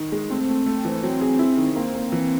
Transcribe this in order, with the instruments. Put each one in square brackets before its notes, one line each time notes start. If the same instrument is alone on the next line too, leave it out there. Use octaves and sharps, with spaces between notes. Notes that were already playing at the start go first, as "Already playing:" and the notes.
Already playing: [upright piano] D#3
G#3
[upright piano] A3 [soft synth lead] C4
[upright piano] A3
A3
E3
[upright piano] F#3 [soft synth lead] C4
[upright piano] G#4
E4
D#3
[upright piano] A#3 [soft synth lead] C4
[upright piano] A#3
E3